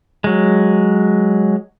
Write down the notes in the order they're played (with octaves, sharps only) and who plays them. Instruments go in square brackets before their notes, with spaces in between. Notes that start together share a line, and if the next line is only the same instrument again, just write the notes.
[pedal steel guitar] F#3 G#3